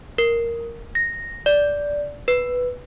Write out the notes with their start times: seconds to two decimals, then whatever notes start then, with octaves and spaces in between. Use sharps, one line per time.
0.18 A#4
0.95 A#6
1.46 D5
2.28 B4